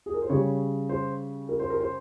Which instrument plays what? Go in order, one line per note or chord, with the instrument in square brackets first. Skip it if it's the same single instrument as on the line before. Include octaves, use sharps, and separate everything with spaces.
[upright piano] G#4
A#4
C5
C#3 G3 C#5
C5
A#4
C5
A#4
C5